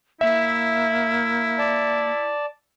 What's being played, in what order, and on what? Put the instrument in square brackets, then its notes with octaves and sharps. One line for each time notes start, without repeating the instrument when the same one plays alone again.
[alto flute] A#3 [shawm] E4 [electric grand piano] E5
[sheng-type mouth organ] D5 A5